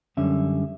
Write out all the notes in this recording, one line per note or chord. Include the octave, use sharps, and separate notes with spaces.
F#2 D3 G3 C#4 E5